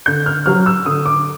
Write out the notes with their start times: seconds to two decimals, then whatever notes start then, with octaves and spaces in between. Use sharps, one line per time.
0.06 D3 G6
0.26 F6
0.46 F#3 F6
0.66 E6
0.86 D3 D#6
1.05 D6